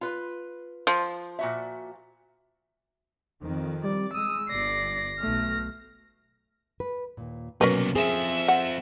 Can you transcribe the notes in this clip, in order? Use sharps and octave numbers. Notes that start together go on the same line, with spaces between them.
F4 B4
F3
A#2 F#4 E5
F2 D#3
G3 D5
G#3 D#6 E6
G1 D5 A#6 C7
B1 A3 F6
B4
D#2 A#2
C2 B2 F#3 A#3 C#4 A#4 B4
F3 C4 G#4 E5
F#5